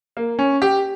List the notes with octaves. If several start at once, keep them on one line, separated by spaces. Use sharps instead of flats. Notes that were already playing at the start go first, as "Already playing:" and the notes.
A#3
C#4
G4